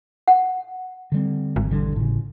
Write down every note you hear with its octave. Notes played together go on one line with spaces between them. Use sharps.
F#5
D3 G3 C4
G#1
E1 D3 G3
A2 C#3